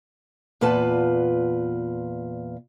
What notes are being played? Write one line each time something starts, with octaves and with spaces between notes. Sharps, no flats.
E2 A#2 F4 B4 F#5 A5